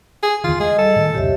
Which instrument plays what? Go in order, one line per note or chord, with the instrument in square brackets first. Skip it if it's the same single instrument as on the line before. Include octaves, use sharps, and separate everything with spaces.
[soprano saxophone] G#4
[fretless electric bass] E2 D3 D#3 [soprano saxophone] F4
[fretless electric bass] G#3 [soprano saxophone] G#4 [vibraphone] D#5
[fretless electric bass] G3 [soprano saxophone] A4
[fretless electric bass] A2 D#3
[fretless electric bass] C#2 F#2 B2 [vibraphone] G4 C#5 E5